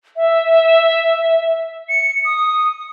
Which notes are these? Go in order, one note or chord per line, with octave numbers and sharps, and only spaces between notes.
E5
C#7
D#6